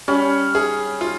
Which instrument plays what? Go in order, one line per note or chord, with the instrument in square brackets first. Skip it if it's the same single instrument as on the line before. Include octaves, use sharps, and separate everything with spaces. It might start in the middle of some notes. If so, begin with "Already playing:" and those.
[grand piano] G3 [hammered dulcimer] C#4
[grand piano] G#4
F4